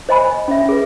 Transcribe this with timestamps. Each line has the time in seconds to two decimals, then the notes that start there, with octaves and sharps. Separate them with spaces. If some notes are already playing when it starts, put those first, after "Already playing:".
0.09 C5 D#5 G#5 B5
0.48 C#4 E5
0.69 G#4 B4